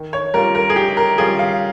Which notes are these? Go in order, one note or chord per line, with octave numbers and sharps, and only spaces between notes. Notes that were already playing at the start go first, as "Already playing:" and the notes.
Already playing: D#3
C#5
G3 C#4 F4 A#4
A#4
G#4
D#3 G4
A#4
G3 C#4 F4 G#4
F5